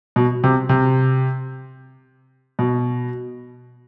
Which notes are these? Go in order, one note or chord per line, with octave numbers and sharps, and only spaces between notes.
B2
C3
C3
B2